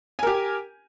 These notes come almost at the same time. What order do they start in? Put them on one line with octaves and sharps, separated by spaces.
G#5 A#4 G4